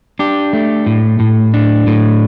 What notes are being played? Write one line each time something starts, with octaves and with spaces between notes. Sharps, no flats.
D4 G4
A3
A2
A2
D4
A2